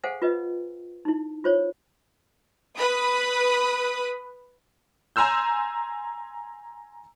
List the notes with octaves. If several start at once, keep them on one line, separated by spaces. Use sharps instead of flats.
G#4 A4 C5 F5 F#5 G#5
F4 B4 D#5
D#4 E4
F4 C5 C#5
B4 B5 D#6
G#5 A#5 C6 E6 G6